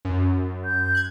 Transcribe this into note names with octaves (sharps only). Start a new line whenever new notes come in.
F#2
G6
F#6 G#6